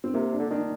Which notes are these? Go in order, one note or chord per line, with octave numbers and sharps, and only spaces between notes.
C4
C3 A#3
D4
D3
D#3 D4